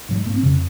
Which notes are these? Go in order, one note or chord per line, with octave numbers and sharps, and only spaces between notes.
G#2 F#3
G#3
G#2 A#3
C4
F2 C#3 C#4